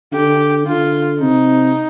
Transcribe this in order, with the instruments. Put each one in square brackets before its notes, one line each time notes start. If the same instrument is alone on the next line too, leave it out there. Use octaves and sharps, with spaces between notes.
[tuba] D3 [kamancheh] G4
[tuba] D3 [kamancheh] F4
[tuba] C3 [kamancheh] D#4